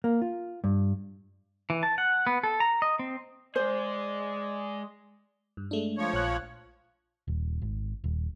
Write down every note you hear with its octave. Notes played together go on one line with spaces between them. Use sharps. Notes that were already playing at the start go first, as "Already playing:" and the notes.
A#3
F4
G2
E3
A5
F#5
B3
A4
A#5
D#5
C4
G#3 G#4 C5 D5
G2
G#3 A3 D4
F3 C#5
A#1 F#6
D#1
G#1
D#1